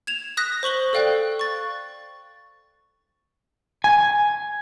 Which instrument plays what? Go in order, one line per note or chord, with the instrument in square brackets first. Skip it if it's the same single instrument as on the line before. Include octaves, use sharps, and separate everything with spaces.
[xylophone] G#6 E7 F7
D#6 F#6 A#6 B6
C5 C#6 F#7 G7
A4 D5 F5 G5 F#6
C#6 A6
[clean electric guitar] G#5